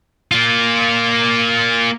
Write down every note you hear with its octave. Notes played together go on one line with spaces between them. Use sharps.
A#3 F4